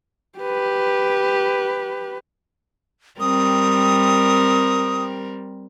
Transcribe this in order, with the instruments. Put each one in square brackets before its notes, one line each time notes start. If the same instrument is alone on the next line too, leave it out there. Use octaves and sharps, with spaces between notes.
[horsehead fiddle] G4 B4
[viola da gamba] G3 C4 A#4 [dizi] D#6